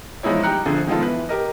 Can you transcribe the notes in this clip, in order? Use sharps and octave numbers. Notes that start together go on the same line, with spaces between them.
E3 F3 G#3 D#4 E4 C#5
G3 D#4 G5 A#5 F#6 C#7
A#1 D3 F3 G#4
D#3 F3 G#3 B3 F4 A4
E3 B4
G4 A#4 D#5